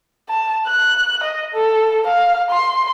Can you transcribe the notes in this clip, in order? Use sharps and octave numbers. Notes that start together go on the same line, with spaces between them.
A5
F#6
D#5
A4
F5
C6